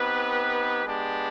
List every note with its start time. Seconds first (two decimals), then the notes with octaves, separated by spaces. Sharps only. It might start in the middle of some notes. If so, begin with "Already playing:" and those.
Already playing: B3 C4 D#4 G4 B4
0.83 G#3 B3 D4 G4